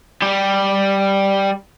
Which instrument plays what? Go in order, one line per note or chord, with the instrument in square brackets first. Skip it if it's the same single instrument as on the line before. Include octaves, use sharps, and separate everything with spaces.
[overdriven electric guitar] G3 G4